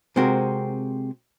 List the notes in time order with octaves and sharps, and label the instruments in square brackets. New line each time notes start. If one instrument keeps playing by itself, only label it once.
[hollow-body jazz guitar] C3 G#3 C4 F#4 A#4